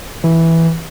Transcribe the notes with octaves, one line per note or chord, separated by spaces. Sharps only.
E3